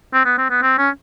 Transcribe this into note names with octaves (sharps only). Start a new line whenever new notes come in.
C4
B3
C4
B3
C4
C#4